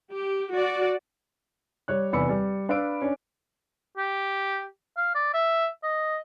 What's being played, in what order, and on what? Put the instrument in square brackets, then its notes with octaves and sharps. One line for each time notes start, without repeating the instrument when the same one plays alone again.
[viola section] G4
F#4 D5
[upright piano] G3 C#5 F#6
F1 E2 D5 B5 E6 C#7
G3
D4 B4 F5 B5 E6 D7
C#4 D4
[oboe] G4
F5
D5
E5
D#5